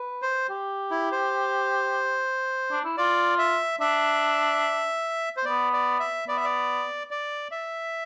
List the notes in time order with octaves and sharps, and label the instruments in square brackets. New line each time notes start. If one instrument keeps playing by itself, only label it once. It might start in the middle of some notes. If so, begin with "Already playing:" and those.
Already playing: [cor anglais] B4
[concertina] C5
[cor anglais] G4
[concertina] E4
C5
[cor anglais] D4
E4
[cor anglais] F4 [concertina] D5
[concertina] E5
[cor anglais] D4 [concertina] E5
[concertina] C5
[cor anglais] B3 [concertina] D5
[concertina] D5
E5
[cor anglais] B3 [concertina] D5
[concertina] E5
D5
D5
E5